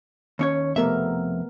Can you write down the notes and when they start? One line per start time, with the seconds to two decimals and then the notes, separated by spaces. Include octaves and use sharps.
0.39 D#2 C#4 C#5
0.76 F2 C3 A3 B3 A#4 E5